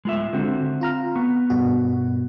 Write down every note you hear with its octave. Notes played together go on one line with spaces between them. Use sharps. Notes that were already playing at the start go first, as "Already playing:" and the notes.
G#3 F4 E5
D3 C4 F#4
F4 A#5 F6
B3 C#6
G2 B2 F#4